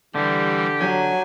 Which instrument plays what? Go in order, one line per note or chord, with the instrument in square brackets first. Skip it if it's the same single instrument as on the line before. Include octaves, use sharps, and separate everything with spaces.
[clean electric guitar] D3 [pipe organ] E3 G3 [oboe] G4
[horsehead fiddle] F#3 [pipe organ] G#5